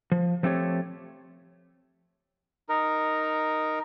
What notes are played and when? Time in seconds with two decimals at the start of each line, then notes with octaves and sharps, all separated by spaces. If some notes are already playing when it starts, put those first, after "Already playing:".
0.12 F3
0.43 F3 A3 C4 G4 C#5
2.69 D#4 A#4